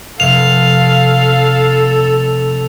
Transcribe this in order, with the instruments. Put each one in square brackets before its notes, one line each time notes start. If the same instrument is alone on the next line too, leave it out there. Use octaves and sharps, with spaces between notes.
[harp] F1 [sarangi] A4 [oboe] F5 [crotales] F7